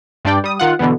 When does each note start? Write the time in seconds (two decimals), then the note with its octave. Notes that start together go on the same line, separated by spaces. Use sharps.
0.25 G2 G3 D4 D5 G5
0.44 G3 D#6
0.59 D#3 F4 F#5
0.79 B2 D3 E3 B3